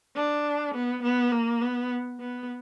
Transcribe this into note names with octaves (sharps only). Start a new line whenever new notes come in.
D4
B3
B3
A#3
B3
B3